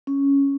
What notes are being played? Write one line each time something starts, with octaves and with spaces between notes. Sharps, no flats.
C#4